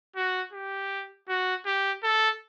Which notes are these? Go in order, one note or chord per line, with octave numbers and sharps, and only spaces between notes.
F#4
G4
F#4
G4
A4